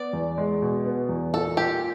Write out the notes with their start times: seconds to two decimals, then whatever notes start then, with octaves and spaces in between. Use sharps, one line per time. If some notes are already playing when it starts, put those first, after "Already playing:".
Already playing: B3 D5
0.13 E2
0.38 G#3
0.62 B2
0.85 B3
1.09 E2
1.33 A#2 A4
1.57 A#2 G4